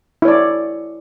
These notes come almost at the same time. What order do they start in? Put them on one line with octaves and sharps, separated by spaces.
E4 C#5 D5